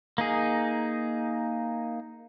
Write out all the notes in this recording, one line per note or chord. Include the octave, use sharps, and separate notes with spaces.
A#3 D#4 G#4